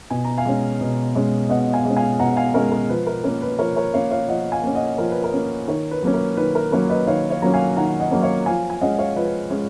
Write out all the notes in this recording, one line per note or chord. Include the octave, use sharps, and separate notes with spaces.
B2 G#5
A#5
F5 G#5
G#3 C#4
B2
G#3 C#4
B2 D#5 F#5
F5 G#5
G#3 C#4
F5 G#5
B2 F#5 A#5
F5 G#5
G#3 C#4 A#4 C#5
A#4
F3 B4
A#4
A#3 C#4 A#4
B4
F3 A#4 C#5
A#4 C#5
A#3 C#4 C#5 F5
C#5 F5
F3 D#5 F#5
F5 G#5
A#3 C#4
D#5 F#5
F3 A#4
B4
A#4
A#3 C#4
D#3 A#4 C#5
B4
F#3 A#3 C#4
A#4
D#3 B4
A#4
F#3 A#3 C#4 A#4 C#5
B4 D#5
D#3 C#5 F5
C#5 F5
F#3 A#3 C#4 A#5
F5 G#5
D#3 F#5 A#5
D#5 F#5
F#3 A#3 C#4
C#5 F5
F3 F5 G#5
G#5
G#3 C#4 D#5 F#5
C#5 F5
F3 B4 D#5
G#3 C#4